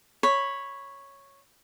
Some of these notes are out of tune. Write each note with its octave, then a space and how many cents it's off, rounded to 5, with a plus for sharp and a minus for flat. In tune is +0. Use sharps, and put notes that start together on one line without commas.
C#5 -5 B5 +0